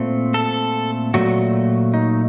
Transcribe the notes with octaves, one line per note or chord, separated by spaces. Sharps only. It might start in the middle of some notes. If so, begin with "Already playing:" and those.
Already playing: A#2 A3 C4
A4
A#2 F#3 A3 F#4
D#4